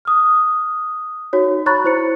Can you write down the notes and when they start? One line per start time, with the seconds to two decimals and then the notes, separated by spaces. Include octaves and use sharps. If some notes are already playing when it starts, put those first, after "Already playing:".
0.05 D#6 F6
1.33 D#4 F#4 C#5
1.66 C#5 A#5 B5 C#6 F#6 A6
1.84 E4 C5 C#7